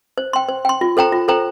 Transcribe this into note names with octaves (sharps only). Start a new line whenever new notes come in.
C5
G5 C6
C5
G5 C6
F4
A4 C5 G5 A#5
F4
A4 C5 G5 A#5